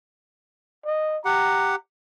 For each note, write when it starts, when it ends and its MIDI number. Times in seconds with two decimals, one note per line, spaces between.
0.86 1.18 75
1.25 1.75 67
1.25 1.75 78
1.25 1.77 82